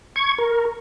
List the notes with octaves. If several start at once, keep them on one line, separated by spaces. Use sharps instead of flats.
C#6 G#6
A#4